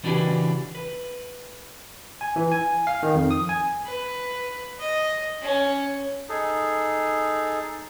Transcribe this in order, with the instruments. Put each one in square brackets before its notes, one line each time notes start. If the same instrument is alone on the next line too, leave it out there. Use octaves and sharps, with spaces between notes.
[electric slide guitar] C#3 E3 D4 F#4 G4 B4
B4
[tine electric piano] G#5
E3
G#5
F5
D#3
F2
D#6
G#5
[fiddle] B4
D#5
C#4
[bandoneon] D#4 G#4 A4